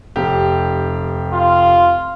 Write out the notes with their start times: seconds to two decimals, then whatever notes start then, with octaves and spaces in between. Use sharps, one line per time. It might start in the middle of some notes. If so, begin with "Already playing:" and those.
0.16 F1 G4
1.33 F4